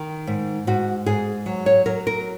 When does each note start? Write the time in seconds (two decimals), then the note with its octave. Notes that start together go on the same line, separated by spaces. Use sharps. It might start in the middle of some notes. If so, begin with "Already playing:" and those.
Already playing: D#3
0.27 G#2
0.67 G#2 F#4
1.06 G#2 G#4
1.46 F#3
1.66 C#5
1.86 F#3 A#4
2.07 A#4